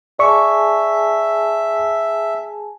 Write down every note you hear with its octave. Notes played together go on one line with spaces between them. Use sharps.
G#4 D5 E5 G#5 A5 C#6